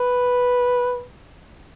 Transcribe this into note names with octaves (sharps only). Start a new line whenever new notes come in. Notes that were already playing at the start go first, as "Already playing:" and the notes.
Already playing: B4